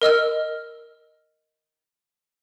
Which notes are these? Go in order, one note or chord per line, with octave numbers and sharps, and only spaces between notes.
A#4 D#5 E6 F6